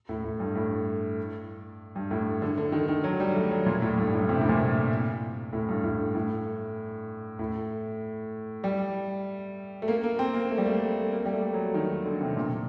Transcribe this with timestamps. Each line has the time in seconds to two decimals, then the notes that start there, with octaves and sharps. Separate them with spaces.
0.09 A2
0.24 A2
0.40 G2
0.55 A2
1.95 G2
2.11 A2
2.42 D3
2.58 D3
2.72 D#3
2.89 D#3
3.04 F#3
3.20 G3
3.35 A3
3.51 F#3
3.66 A#2
3.82 A2
3.97 G2
4.07 G2
4.12 A2
4.29 C3
4.41 A2
4.49 A#2
5.53 A2
5.68 G2
5.84 A2
6.15 A2
7.39 A2
8.64 G3
9.82 A3
9.88 A#3
10.04 A#3
10.19 C4
10.35 A#3
10.51 A3
10.58 G3
10.66 A3
11.12 A#3
11.26 G3
11.33 A3
11.54 F#3
11.74 D#3
12.06 D3
12.21 C3
12.37 A#2